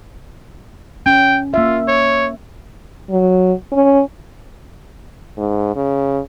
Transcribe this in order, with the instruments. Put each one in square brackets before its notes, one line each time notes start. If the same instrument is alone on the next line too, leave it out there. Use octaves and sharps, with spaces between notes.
[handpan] C#4 [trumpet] G5
[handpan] A#3 E5 [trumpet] F4
[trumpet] C#5
[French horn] F#3
C#4
G#2
C#3